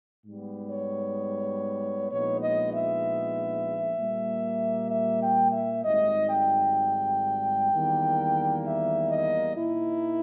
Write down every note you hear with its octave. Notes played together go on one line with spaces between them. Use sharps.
G#2 G3 B3
C#5
A#1 A#2 G#3 B3 D#4 C#5
D#5
E5
A#2 G3 A#3
E5
G5
E5
G#1 G#2 G3 D#5
G5
E2 D#3 G3 A#3
E5
D#5
A#2 A#3 D#4 E4